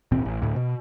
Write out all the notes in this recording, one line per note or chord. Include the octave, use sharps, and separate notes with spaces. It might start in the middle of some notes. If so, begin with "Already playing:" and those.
D#1 A1 B2 C4
A1
D2 A2
B2